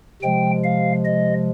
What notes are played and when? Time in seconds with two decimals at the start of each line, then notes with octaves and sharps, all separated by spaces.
0.22 C3 F3 G#3 G5
0.64 F5
1.05 D#5